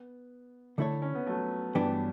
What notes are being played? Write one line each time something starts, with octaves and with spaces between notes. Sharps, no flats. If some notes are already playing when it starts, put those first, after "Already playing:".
Already playing: B3
D3 A3 E4 A4 C#5
C#4
B3
F#3 A3
G2 E3 B3 D4 G4